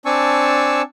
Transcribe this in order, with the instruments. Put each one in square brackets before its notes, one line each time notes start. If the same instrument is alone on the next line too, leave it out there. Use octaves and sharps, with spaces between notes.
[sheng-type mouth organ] C4 D4 G#5 A5 C#6 E6